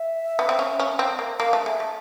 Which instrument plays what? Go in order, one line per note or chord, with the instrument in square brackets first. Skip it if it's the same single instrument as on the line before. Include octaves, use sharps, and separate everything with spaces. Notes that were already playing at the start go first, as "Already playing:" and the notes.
Already playing: [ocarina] E5
[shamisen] B3
C4
C#4
C#4
C4
A#3
[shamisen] A#3 [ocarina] F5
[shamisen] A3
[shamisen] G#3 [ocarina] E5
[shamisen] A3